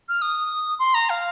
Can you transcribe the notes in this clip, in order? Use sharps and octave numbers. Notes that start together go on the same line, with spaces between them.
F6
D#6
C6
A#5
F5